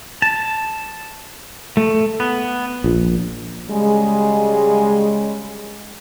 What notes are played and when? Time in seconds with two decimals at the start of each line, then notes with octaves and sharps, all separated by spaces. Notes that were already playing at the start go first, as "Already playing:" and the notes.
0.22 A5
1.77 A3
2.20 B3
2.84 A#1
3.70 C#3 G3 G#3